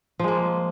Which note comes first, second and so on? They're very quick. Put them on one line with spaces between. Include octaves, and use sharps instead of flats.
F3 G#3 A#3